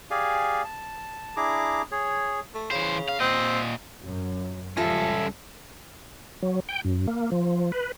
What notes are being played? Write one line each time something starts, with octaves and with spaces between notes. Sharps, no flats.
G4 G#4 D5 F5 G#5
A5
D4 E4 G#4 A#5 D6
G#4 C#5
A3
C#3 E3 C5
F5
A#2 C4 D#5
F#2
C#2 F3 G3 C#4 F4 A4 E5 A#6
F#3
G5
F#2
A#3
F3
B4